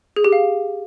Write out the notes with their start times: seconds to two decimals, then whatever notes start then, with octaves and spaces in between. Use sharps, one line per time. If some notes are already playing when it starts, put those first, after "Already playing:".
0.16 G#4
0.24 G4
0.32 F5